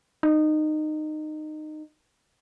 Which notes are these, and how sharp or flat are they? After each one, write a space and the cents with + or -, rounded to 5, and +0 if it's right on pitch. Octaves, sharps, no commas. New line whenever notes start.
D#4 -20